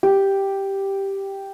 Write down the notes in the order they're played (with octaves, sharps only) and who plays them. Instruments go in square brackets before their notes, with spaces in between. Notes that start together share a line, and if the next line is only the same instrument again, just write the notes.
[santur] G4